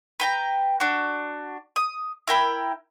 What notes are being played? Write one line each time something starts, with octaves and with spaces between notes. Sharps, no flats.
B4 G5 A#5
D4 F#4
D#6
E4 A#4 G5 B5